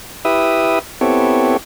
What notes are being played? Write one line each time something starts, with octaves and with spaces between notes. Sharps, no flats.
E4 G4 B4 E5 D#6
B3 C4 E4 G4 A4 C#5